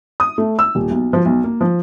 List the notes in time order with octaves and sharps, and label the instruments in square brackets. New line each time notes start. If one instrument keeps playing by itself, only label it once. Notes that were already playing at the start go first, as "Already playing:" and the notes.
[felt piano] D#6
A3
E6
D#1
B1
F3
B1
A#3
F3